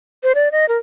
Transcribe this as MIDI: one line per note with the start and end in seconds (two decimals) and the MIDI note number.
0.23 0.32 72
0.35 0.49 74
0.52 0.66 75
0.69 0.78 70